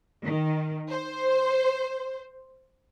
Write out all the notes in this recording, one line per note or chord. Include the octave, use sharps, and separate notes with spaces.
D#3
C5